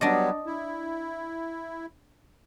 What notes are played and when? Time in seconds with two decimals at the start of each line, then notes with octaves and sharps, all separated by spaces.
0.01 F#3 G3 B3 D4 D5 D#5
0.46 E4